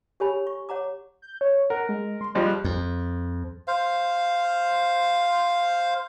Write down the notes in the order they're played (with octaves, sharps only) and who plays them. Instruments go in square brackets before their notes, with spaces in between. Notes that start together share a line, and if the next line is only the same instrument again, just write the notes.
[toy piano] G4 A4 C#5 G#5 B5
C#6
C#5 F#5 A#5 D6
[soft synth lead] G6
C#5
[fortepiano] A#4 [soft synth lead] F#5
[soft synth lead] G#3
C6
[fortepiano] F3 G3 G#3 [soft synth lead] F#6
[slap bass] F2
[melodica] C5 F5